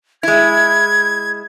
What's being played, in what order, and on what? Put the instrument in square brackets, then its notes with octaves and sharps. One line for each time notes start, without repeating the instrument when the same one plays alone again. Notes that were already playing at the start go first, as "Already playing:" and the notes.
[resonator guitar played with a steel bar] G#3 E4 [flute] G#6